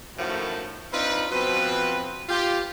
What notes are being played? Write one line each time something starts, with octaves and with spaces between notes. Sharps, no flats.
F#2 A2 D#3 F3 A3 F#5
C4 D4 D#4 F4 B4
B2 F3 C4 B4
F4 G4